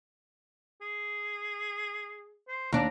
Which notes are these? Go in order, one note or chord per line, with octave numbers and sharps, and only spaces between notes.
G#4
C5
D#2 D4 A#5